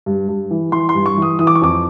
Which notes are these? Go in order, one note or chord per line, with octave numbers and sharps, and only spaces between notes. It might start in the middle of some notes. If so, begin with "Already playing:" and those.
G2
G2
E3
E3 C6
C6
G2
C#6
E3 D#6
E3 D#6
D6
C#6
F2 D6